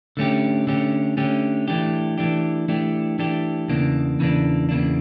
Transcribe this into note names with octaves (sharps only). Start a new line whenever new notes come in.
D3 A3 C#4 G4
D3 A3 C#4 G4
D3 A3 C#4 G4
E3 A3 D4 G4
E3 A3 D4 G4
E3 A3 D4 G4
E3 A3 D4 G4
E2 C#3 E3 A#3 D4
E2 C#3 E3 A#3 D4
E2 C#3 E3 A#3 D4